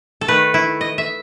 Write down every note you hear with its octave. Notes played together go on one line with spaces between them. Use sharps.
A4
D#3 A3 B4
E4
D#5
E5